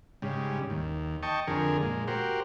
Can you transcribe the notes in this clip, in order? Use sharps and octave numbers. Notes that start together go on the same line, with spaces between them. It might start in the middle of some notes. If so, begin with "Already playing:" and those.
G#2 C#3 G3
D#2
D#5 G5 A5 C#6
F2 D3 G#4 A#4
A#2 G#3
F#4 G4 A#4 C5